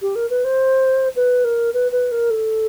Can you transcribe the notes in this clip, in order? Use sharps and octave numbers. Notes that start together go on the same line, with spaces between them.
G4
A#4
B4
C5
B4
A#4
B4
B4
A#4
A4